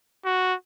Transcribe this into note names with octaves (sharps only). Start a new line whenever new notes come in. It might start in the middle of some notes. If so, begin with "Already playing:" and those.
F#4